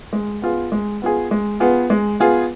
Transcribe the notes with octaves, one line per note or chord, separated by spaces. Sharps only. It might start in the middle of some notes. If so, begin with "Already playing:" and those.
G#3
B3 F4 G#4
G#3
B3 F4 G#4
G#3
B3 F4 G#4
G#3
B3 F4 G#4